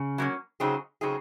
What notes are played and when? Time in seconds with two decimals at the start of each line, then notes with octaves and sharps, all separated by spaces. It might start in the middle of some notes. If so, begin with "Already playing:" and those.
Already playing: C#3
0.18 F#3 A#3 C#4
0.60 C#3 F#3 C4 D#4 G#4
1.01 C#3 F#3 C4 D#4 G#4